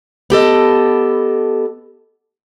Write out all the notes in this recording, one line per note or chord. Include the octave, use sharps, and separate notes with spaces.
B3 G4 A4 D#5